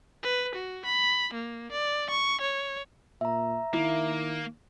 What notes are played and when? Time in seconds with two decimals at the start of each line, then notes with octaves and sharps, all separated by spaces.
0.23 B4
0.55 F#4
0.85 B5
1.34 A#3
1.72 D5
2.10 C#6
2.41 C#5
3.21 A#2 E5 A#5
3.73 D#3 A#3 E4